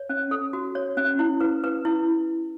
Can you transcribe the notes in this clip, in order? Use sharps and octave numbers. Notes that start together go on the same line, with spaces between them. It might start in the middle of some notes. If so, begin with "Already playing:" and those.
Already playing: C#5
C#4
A4
F#4
C#5
C#4
E4
B4
B4
E4